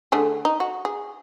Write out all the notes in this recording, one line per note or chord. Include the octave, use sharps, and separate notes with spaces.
D3 A3 G#4
D#4
F#4
G#4